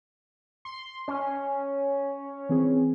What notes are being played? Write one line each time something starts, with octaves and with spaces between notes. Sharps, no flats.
C6
C#4
E3 C4 G#4